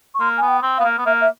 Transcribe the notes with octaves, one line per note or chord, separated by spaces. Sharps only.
C#6
A#3 C6
B3 G#5
G5
C4
B3 F5
A#3
B3
A#3 E5
E5